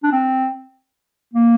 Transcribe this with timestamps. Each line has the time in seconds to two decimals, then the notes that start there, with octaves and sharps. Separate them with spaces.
0.04 D4
0.12 C4
1.34 A#3